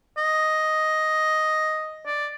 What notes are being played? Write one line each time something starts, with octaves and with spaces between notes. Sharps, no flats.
D#5
D5